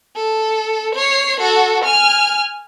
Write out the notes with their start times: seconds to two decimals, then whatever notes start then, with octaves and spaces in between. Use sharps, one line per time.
0.16 A4
0.95 C#5 C7
1.40 F#4 A4
1.84 G#5 F6